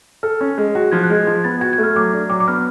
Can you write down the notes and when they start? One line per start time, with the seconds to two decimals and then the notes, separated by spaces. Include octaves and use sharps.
0.23 A4 F6
0.41 C#4
0.58 G#3
0.75 F#4
0.91 F3 G#6
1.03 F#6
1.10 G#3 G#6
1.27 F3 G#6
1.44 B3 A6
1.61 F#4 G#6
1.73 G#6
1.78 A3
1.83 F6
1.96 F#3 D6
2.13 D4
2.30 F#3 D6
2.40 D6
2.48 B3 F6